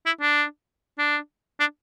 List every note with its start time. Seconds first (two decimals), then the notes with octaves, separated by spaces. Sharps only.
0.06 E4
0.21 D4
0.98 D4
1.60 D4